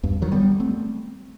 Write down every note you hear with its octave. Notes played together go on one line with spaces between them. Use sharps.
E2 G2
D#3 F#3
G3 B3
A3 C4